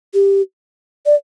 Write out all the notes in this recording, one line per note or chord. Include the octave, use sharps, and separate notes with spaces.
G4
D5